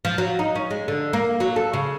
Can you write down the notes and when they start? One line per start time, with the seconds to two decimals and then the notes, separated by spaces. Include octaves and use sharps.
0.05 F3
0.18 F#3
0.39 D#4
0.55 C#4
0.70 G#3
0.88 D3
1.13 A#3
1.40 F#3
1.56 A4
1.73 C#3